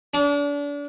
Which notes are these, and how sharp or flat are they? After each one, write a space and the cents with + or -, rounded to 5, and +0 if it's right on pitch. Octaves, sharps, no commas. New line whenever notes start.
D4 -35